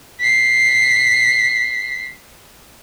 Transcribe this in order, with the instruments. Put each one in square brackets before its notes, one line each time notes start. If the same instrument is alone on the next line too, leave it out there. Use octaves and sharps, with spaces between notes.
[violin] B6 C7